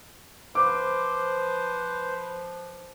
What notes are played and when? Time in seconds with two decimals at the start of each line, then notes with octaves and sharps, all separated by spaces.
0.55 F3 B4 C5 D6